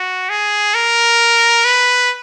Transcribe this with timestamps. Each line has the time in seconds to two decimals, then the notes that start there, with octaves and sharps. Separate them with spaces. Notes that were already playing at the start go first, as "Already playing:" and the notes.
Already playing: F#4
0.29 G#4
0.74 A#4
1.65 B4